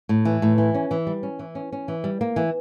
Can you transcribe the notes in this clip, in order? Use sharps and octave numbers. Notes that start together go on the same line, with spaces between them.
A2
E3
A2
E3
C#4
E3
G3
C#4
E3
C#4
C#4
E3
G3
A#3
E3